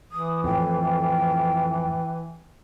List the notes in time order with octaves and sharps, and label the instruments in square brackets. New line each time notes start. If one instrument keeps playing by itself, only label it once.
[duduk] E3 [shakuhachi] D#6
[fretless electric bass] F2 A2 [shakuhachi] G5